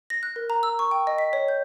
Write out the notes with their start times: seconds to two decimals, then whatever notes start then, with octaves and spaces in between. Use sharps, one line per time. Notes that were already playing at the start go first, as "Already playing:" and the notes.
0.10 A#6
0.23 F#6
0.36 A#4
0.50 A#5
0.63 E6
0.79 C#6
0.91 G5
1.07 D#5
1.18 B6
1.33 C#5
1.48 G6